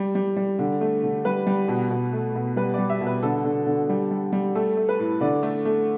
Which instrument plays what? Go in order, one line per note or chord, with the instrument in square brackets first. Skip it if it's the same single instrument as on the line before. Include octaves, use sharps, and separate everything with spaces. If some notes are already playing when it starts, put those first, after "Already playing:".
Already playing: [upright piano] G3
G3
G3
D3
A3
D3
G3 B4
G3
B2
B2
A3
B2
G3 B4
G3 D5
E5
B2
B4
D3 A4
D3
D3
G3
G3
G3
A3 A4
A3
B4
A2
D3 D5
A3
A3